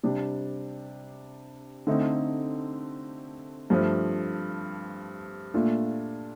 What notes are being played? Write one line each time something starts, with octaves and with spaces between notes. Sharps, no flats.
C3 G3 D4 G4
D3 A3 C4 D#4
G2 F3 A3
A#2 A3 D4 F4